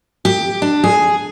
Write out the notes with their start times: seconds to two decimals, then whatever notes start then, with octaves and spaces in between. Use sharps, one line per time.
0.25 G4
0.62 D4
0.84 G#4